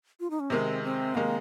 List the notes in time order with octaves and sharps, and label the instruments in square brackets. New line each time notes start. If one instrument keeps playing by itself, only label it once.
[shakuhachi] F4
D#4
C#4
[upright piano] C3 D#3 G#3 [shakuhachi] C4
[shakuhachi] C4
[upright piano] C3 D#3 G#3 [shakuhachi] A#3